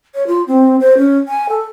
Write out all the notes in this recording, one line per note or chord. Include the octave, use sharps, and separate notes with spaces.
C#5
F4
C4
C5
C#4
G#5
A4